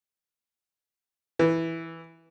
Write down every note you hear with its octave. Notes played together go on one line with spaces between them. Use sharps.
E3